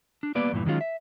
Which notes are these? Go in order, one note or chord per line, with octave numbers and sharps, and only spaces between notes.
D4
G3 A#3 B3 B4 D5
E2 G2 A#2 E3
D#3 F#3 G#3 C#4 F4
E5